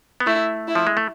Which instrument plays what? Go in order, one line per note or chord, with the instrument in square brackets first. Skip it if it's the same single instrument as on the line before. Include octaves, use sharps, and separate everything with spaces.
[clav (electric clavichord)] B3
[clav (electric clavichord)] A3 [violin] E4
[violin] E4
[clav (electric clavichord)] F3
G#3
A3